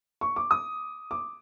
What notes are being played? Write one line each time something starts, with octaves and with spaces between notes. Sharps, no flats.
C#6
D6
D#6
D6